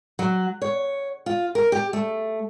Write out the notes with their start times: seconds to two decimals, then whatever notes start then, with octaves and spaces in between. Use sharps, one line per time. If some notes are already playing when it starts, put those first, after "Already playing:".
0.19 F#3
0.62 C#5
1.26 F4
1.55 A#4
1.72 G4
1.93 A3